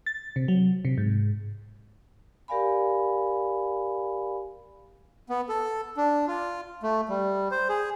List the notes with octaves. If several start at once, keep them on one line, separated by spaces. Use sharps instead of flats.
A6
C3
F#3
C3
G#2
G4 A#4 D5 F5 G#5 B5
B3
A4
D4
F4
A3
G3
C5
G#4